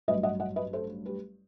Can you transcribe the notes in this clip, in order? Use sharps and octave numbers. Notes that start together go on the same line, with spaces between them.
A1 G2 F#3 B4 D#5
D#5 F#5
D#5 F#5
B4 D#5
A4 C5
G4 B4